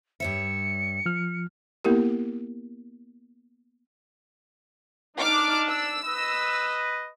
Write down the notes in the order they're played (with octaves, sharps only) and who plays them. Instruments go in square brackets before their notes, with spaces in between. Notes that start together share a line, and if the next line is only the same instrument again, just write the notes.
[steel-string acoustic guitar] G2 C#5 E5 [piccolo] C#7
[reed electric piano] F3 F6
[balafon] A#3 B3 E4 G4 A#4
[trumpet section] D4 [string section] D#4 D6 F6
[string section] E6
[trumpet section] B4 D#5